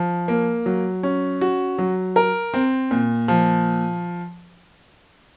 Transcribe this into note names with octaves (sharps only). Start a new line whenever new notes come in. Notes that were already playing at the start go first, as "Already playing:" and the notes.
Already playing: F3
A#3
F#3
C#4
F#4
F#3
A#4
C4
A#2
F3